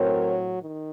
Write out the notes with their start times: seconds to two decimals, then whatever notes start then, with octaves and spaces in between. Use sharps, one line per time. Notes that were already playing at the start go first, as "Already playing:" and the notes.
Already playing: A2 F#3 C4 A#4 C#5
0.60 D#3